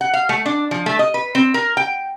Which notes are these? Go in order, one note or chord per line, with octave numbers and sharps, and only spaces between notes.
F#5
F5
A3
D4
F3
A3
D#5
B4
C4
A#4
G5